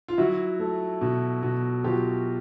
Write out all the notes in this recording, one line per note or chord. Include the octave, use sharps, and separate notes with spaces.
F4
F#3 E4 F#4
A3
B2
B2
F#3 F4 G4